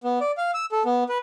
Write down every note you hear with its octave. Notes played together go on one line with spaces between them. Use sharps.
B3
D5
F5
E6
A4
B3
B4